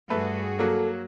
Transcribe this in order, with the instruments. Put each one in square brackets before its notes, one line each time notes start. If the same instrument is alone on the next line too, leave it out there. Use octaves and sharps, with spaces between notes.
[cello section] G2 F#4 G#4 [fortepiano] A3 B4
[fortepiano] F#3 A#3 [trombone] A4